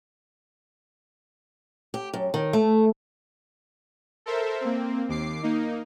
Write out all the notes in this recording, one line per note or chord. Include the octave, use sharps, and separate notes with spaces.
G4
F#2
D#3
A3
A4 A#4 C5 E5
A#3 C4
D#2 D6 C7
A#3 D#4